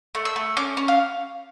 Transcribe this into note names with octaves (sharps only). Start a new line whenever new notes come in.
A3
E6
A3
C#4 D6
C#4
F5